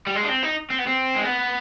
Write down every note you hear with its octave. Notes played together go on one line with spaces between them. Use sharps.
G3
G#3
D4
C4
D#4
C4
B3
C4
G#3
B3